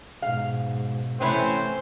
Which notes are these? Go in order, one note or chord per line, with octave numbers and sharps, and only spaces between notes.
G#2 B2 F5
C3 E3 A3 C4 C#4 B4 C5